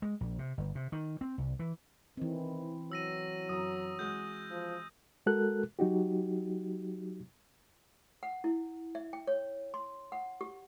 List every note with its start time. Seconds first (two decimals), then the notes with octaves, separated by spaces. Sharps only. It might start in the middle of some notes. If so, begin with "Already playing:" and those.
0.02 G#3
0.21 A#1
0.39 C3
0.58 G1
0.75 C3
0.92 D#3
1.21 C4
1.38 C2
1.59 E3
2.17 D#3 E3 C4
2.92 F#3 E6 A#6 D#7
3.49 F#2 A#5 D#6
3.99 G#3 F#4 G6
4.51 F3
5.26 G#3 F#4 A4 A#4 F#6
5.79 F#3 D#4 F#4 G4
8.23 F#5
8.44 E4
8.95 E5
9.13 G5
9.27 C#5
9.74 C6
10.12 F#5
10.41 G4